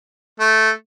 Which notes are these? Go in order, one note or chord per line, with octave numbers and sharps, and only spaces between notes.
A3